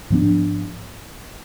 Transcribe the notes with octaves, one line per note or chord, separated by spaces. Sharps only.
G#2 F3 B3 D4